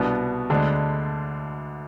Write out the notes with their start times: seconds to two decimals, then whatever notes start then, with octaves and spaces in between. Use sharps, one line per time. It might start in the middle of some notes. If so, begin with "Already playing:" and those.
Already playing: C2 B2 B3 D4
0.50 D2 D3 G#3 D4